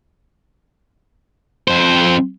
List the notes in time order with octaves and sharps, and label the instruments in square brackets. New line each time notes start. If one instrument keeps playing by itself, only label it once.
[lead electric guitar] F2 C5